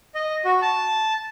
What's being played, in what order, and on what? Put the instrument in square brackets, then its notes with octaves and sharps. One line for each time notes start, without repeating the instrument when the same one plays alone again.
[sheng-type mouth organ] D#5
F#4
A5